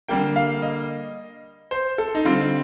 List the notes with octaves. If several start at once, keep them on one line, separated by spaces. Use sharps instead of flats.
D3 G3 A#3 G5
F5
D#5
C5
A4
D#4
D3 G3 C4 F4